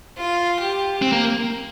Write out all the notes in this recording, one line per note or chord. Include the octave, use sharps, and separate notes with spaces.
F4
G4
C4
A#3